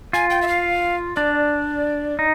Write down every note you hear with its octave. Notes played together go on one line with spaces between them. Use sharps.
F4 G#5
G5
E5
F5
D4 D5
D#4